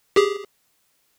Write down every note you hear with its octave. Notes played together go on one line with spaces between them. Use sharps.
G4 G#4